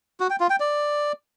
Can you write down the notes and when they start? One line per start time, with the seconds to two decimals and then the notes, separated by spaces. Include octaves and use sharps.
0.20 F#4
0.30 G5
0.40 F4
0.50 G5
0.60 D5